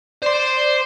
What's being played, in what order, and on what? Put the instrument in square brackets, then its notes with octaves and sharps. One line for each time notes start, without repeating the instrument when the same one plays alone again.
[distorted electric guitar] C5 C6 [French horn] D5